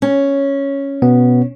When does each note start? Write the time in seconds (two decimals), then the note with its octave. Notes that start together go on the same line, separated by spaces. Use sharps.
0.02 C#4
1.02 B2 B3